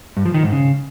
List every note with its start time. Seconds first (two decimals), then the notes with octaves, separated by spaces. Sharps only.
0.17 G2
0.26 F3
0.34 D#3
0.43 G#2
0.52 C#3